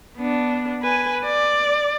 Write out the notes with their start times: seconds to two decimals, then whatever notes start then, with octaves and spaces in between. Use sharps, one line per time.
0.17 B3 D4
0.83 B4 G#5
1.25 D5